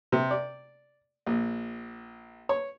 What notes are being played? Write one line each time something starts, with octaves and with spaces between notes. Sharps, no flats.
C3
D5
A#1
C#5